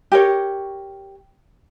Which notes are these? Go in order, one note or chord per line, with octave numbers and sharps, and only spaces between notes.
G4 A#4 C#5